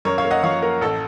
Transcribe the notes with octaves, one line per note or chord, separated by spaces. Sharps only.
F#2 A#4 C#5
C#5 F5
A#3
D#5 F#5
F3 C#5 F5
A#3 A#4
A1 A4